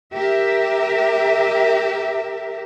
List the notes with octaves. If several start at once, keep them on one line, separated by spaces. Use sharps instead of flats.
G4 A#4 E5